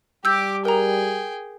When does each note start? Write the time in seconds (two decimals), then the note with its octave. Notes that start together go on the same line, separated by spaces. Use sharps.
0.25 G3 G4 D6 E6 G6
0.65 G#4 A#4 G5 A#5